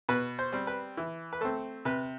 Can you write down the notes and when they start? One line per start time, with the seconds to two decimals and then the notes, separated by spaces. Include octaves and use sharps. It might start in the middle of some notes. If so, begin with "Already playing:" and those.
0.09 B2 B4
0.39 C5
0.52 G3 C4
0.67 B4
0.97 E3
1.33 B4
1.41 A3 C4 A4
1.85 C3 B4